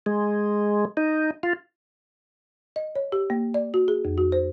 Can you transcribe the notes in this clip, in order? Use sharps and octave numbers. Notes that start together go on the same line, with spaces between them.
G#3
D#4
F4
D#5
C#5
G4
A#3
D5
F#4
G#4
F2
F#4
C5